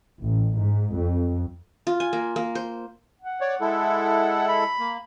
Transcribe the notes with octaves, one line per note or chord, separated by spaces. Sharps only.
A1
G#2
F2
F4
G#5
A#3
A#3
C5
F#5
C#5 D5
G#3 E4 A4
B5
A#3